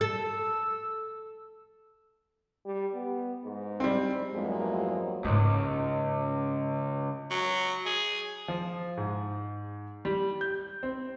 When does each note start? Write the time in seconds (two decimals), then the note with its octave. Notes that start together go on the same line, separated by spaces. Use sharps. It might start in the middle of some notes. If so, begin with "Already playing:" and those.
0.01 A4 E6
2.65 G3
2.95 B3
3.45 G#2
3.80 G3 C4
4.34 E2 G2 F3 F#3 G#3 A#3
5.25 C#2 G#2 A#3
7.31 F#3
7.86 G#4
8.48 F3
8.97 G#2
10.05 G3
10.41 G6
10.83 C4